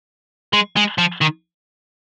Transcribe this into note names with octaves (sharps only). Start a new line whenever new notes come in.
G#3
G#3
F3
D#3